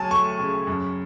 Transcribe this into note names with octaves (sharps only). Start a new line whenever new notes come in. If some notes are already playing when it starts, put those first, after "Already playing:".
Already playing: D2 F#3 G#5 A5
A3 C#6
C#3
F#2